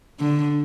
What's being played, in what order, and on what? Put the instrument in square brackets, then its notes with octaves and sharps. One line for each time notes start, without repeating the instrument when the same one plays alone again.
[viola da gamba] D3